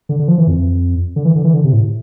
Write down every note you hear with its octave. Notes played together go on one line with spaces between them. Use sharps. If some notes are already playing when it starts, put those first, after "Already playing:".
D3
D3
F3
E3
F2
D3
E3
D3
E3
D3
C3
A2